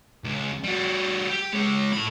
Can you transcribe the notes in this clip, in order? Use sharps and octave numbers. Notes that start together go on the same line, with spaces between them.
C#2
G3 F#4
G4
G#3 C#5
A2 B5